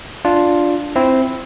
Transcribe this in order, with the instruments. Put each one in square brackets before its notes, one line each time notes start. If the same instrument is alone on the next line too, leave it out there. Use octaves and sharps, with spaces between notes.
[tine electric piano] D4 F4
C4 E4